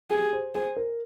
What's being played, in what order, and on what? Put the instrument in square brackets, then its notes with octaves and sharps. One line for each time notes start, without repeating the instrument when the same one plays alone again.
[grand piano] G4 [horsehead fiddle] G#4
[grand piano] C5
[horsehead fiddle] G#4 [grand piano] C5
[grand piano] A#4